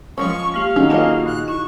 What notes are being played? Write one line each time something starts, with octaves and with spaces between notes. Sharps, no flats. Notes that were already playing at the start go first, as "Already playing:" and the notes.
F3 G#3 C#4 C#6
A#3 G4 F5 F6
D#3 C#4 D#4 F#4 G#4
A#3 F4 A4 D#5 A5
A#2 F#6
E4 C#6